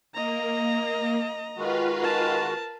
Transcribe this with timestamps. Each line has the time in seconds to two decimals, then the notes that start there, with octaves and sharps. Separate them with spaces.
0.14 A#3 D#5 A#5
1.57 D#3 G#3 F4 F#4 B4 F5
2.00 A#4 A5